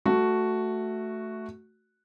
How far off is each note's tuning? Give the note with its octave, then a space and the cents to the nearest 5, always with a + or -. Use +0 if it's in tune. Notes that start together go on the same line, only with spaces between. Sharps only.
A3 +0 F#4 +0